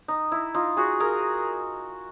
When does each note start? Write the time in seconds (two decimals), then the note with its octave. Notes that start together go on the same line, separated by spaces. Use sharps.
0.08 D#4
0.32 E4
0.54 D#4 F4
0.77 F#4 G#4
1.00 G#4 A#4